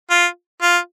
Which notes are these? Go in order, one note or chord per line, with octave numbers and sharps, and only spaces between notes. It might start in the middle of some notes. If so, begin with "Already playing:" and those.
F4
F4